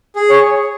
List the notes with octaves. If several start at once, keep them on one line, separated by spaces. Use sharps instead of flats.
G#4
C#5